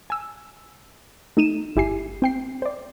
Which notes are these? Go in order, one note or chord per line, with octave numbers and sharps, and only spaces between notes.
G#5 E6
A3 D#4 D#7 E7
G1 E4 G4 G#5 C7
C4 G5 C7
C5 D5